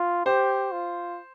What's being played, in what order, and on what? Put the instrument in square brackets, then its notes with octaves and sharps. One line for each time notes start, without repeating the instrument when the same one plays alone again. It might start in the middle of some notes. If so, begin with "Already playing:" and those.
Already playing: [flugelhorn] F4
[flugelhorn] G4 [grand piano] C5
[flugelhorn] F4